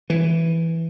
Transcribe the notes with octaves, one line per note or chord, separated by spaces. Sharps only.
E3